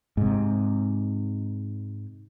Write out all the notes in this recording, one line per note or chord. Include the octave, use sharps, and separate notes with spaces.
G#2 C3